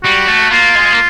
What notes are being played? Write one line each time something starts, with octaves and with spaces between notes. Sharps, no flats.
G3 F#4
A3
A#3 F4
G#3
A#3